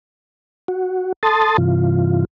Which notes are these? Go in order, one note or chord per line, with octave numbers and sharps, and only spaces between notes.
F#4
A4 A5 C6 D#6 A6
G2 C3 E3 F4